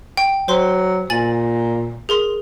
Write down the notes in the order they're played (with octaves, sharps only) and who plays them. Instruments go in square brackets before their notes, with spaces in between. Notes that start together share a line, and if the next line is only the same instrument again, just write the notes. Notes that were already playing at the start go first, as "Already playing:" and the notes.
[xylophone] G5
[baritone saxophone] F#3 [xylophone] C5 C6
[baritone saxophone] A#2 [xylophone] G#5 A6 F#7
[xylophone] G#4 A#4 C6